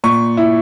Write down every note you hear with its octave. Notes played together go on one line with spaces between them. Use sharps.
A#2 C#6
E4